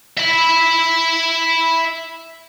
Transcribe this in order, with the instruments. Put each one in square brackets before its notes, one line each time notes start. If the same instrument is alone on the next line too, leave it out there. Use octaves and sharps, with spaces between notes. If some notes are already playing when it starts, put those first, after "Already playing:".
[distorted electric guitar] E5 B5